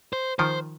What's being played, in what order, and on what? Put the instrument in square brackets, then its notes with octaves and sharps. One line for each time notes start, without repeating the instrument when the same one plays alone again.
[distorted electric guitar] C5
[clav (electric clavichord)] D#3 F3 [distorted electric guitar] C5